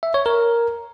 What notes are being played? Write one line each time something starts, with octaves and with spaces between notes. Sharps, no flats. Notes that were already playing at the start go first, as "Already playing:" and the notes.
E5
C#5
A#4